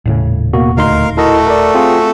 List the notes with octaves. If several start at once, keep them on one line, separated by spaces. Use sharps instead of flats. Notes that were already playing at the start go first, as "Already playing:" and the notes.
D#1 A2 C#3
B2 A#3 F#4
D2 D#4 A#4 F5 C6
A3 E4 F#4 A4 A#4 D#5
A#4 D5
C4 F4 G#4